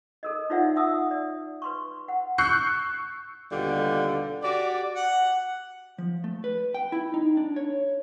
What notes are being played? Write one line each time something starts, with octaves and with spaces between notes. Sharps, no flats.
A4 A#4 D#5
D#4 F4 C5 D5 E5 F#5
E5 F#5 A5 D#6 E6
D5
B4 C6 C#6
F#5
C#6 E6 F#6 G6 C7 C#7
D#2 B2 D3 G3 F4
F#4 G4 D5
F#5
F3
A3
B4
G5
E4
D#4
D4
C#5